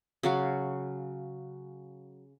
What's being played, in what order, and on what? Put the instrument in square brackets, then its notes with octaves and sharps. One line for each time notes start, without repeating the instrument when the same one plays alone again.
[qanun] C#3 F#3 F5